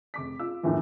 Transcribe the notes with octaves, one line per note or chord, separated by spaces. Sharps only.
F1 D6 B6
F4 E6
G1 D#2 A2 E3 F3